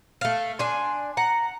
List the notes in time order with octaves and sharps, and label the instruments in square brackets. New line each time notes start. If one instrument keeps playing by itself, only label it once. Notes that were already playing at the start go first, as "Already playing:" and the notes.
[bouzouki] A3 F5
[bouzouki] D4 G#5 [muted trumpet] C6
[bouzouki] F#5 [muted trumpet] A#5